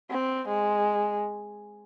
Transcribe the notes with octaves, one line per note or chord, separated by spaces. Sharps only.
C4
G#3